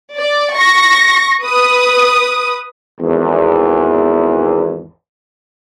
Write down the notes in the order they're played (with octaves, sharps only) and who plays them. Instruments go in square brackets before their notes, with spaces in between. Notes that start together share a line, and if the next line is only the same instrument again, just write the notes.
[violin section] D5
C#6 A#6
B4 D#6
[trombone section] G#1 E2